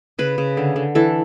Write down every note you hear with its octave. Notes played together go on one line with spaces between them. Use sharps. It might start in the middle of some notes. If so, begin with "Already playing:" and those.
C#3 B4
C#3
D3
D3
E3 A4